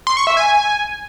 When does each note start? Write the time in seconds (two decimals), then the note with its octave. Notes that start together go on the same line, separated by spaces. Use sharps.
0.07 C6
0.17 C#6
0.27 E5
0.37 G#5